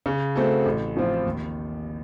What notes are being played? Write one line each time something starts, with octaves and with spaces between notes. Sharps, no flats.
C#3
A3 C4 F#4 A4
A1
A2 F3 C4 F4
D#2